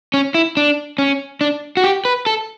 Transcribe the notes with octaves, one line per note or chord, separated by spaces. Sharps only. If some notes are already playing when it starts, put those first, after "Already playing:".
C#4
E4
D4
C#4
D4
F#4
G4
B4
A4